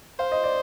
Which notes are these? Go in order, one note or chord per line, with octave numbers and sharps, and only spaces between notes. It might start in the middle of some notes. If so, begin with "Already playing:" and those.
C5 F5
D#5
D5